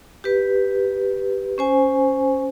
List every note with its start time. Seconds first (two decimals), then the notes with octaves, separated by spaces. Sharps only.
0.24 G4 B4
1.58 C#4 C5 G#5